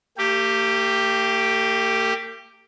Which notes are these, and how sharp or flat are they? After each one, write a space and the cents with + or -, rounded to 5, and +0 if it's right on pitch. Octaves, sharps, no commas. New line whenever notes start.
A#3 -45 G4 +0